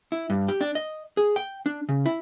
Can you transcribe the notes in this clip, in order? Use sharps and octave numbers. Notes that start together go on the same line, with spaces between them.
E4
G2
G4
D4
D#5
G#4
G5
D4
C#3
E4